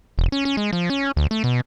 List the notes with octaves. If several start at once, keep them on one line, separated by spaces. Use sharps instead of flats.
E1
C#4
C#4
G#3
F3
C#4
D2
A3
B2